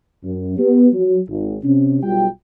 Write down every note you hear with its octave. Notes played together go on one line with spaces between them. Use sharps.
F#2
B3 G4
F#3
G#1
C3 C#4
B1 G3 F4 F#4 G5